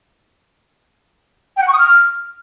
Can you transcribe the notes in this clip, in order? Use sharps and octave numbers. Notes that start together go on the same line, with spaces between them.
G5
F#5
C#6
D#6
F6